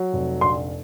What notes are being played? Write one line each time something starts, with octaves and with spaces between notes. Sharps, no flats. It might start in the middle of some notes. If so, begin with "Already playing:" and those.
Already playing: F#3
F1
A#1 C6